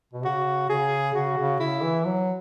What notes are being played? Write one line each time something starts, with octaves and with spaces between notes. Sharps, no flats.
B2
C#3 F#4
C#3 G#4
C#3 F#4
C#3
C#3 E4
E3
F#3